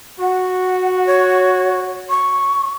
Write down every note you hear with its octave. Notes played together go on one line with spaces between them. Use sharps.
F#4 F#5
C#5
C#6